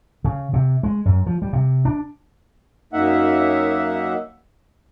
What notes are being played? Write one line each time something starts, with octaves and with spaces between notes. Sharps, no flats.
C#3
C3
G#3
F#2
F3
G3
C3
D4
F#2 A#3 D#4 E5 F#5